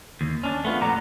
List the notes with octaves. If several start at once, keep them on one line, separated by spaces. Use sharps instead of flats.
D#2
C#4 D4
A3 B3 F4
F2 A#2 D5 F#5 A#5